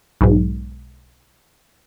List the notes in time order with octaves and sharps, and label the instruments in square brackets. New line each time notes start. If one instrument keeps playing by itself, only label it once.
[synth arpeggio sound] B1 G#2